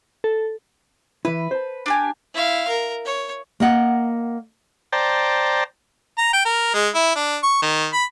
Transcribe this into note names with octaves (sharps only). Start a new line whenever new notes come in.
A4
E3 E4 B4
C5 A5
D4 G4 G#5
E4 F5
A#4
C#5
A#3 A#4 D#5 F#5
C5 D5 G5 A5 A#5
A#5
G5
A#4
G#3
E4
D4
C#6
D#3
B5